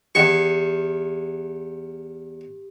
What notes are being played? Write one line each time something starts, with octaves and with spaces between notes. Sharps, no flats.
E2 G4 C#6